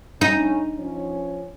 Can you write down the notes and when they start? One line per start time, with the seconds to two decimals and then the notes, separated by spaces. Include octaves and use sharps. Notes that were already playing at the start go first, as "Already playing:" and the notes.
0.21 A2 C#4 D#4
0.79 F3 C#4